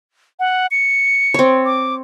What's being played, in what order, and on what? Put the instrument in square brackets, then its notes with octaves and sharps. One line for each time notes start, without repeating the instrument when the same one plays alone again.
[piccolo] F#5
C#7
[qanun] C4 C#5
[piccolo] D6